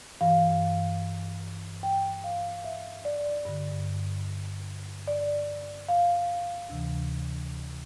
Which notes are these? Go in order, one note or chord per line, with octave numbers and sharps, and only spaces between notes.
G2 E3 F5
G5
F5
E5
D5
G2 D3
D5
F5
D2 C3 E3